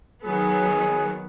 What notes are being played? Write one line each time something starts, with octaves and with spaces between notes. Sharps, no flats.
D#3 F#3 B3 G#4